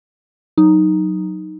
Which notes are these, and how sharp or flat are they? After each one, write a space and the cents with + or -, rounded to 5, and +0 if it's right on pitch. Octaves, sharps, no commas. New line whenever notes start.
F#3 +0 D#4 +0